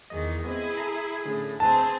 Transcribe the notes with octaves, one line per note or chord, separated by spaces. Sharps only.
E2 D#3 G#4 D#5
B3 C4 E4 G#4 D#5
A4 G#5 A#5
A2 D3 C#4 G#4
D2 C4 G#4 B4 A5